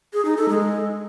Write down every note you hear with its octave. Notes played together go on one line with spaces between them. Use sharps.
G#4
D#4
A4
G#3